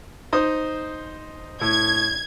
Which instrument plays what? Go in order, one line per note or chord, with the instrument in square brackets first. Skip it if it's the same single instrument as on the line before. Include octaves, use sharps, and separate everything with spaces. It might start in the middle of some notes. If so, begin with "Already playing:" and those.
[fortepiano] D#4 C5 D#6
[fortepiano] A2 [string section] G#6